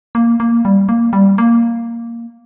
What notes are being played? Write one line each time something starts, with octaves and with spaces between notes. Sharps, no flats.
A#3
A#3
G3
A#3
G3
A#3